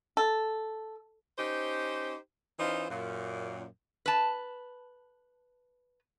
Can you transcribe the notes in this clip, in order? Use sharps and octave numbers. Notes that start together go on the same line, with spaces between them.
A4
C#4 D#4 G4 C5
E3 C#4 D#4 F4 C5
F#2 A#2
B4 A5